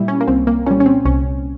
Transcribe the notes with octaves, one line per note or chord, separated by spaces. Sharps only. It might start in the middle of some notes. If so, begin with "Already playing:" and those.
Already playing: A#2 G3 E4
C#4
A#3
C2 C4
A#3
A#2 G3 C#4
C#4
C4
C2 C#4